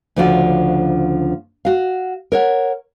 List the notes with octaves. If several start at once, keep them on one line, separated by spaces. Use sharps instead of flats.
D2 C#3 F3 D4 F4 F#4
F#4 F5
A#4 C#5 F#5